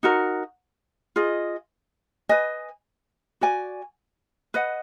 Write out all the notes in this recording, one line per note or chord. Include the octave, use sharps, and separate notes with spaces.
D#4 F#4 A#4
F4 G#4 D#5
B4 D#5 G#5
F#4 D5 G#5
B4 D#5 F#5